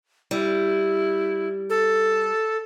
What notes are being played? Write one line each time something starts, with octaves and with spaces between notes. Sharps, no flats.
G3 E4
A4